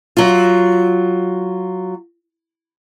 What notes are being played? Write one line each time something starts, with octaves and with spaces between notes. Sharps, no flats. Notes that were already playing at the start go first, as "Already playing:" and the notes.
F#3 F4